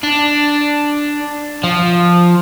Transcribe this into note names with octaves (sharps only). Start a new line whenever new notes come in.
D4
F3